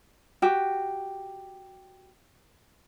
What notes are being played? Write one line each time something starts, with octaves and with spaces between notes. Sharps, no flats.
F#4 G4